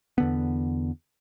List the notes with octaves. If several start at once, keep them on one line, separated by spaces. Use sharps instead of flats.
E2 D3 B3